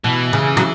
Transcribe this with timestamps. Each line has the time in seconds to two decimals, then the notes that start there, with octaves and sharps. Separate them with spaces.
0.04 B2 E3
0.33 C#3
0.57 F#3